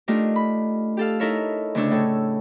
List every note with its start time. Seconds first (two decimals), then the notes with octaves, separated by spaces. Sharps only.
0.08 A3 D4 D#4 F4 G4 A#4
0.36 B5
0.97 G4 A4 F5
1.20 D#4 E4 A4 A#4 C#5 E5
1.75 D2 C#3 A3 D4 C#5 E6
1.91 A2 A4 C#5